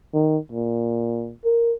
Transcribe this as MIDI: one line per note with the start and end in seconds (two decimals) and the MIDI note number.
0.14 0.37 51
0.52 1.32 46
1.45 1.73 70